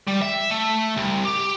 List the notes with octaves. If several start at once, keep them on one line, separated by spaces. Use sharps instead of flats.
G3
E5
A3
C2
G4